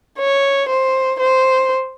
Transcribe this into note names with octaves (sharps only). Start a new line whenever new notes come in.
C#5
C5
C5